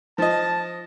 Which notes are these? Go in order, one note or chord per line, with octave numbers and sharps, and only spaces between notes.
F3 D#5 A5